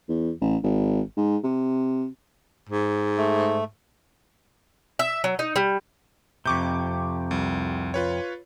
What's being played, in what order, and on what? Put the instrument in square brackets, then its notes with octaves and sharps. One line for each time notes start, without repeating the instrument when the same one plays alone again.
[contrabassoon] E2
A1
G#1
G#2
C3
[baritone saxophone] G#2
[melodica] A3
[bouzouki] E5
F#3
D#4
G3
[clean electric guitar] F2 C3 [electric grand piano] C#6 D6 G6
[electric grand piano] C2
F4 B4 C#5